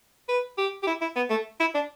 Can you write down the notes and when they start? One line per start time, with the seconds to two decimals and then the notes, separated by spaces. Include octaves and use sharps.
0.29 B4
0.58 G4
0.83 G4
0.87 E4
1.02 E4
1.16 B3
1.30 A3
1.60 E4
1.75 D4